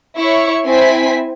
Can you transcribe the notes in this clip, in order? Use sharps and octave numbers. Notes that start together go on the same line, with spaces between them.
E4 C#5 C#6
C4 E4 G#5 B6